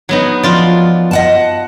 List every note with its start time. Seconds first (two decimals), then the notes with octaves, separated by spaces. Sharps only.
0.09 F#3 B3 D#4
0.43 F3 F4 D5
1.11 D#5 F#5 A5